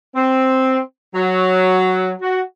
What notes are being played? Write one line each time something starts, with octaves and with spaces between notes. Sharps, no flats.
C4
F#3
F#4